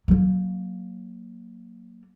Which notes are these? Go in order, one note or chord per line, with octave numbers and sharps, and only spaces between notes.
F#3 A#3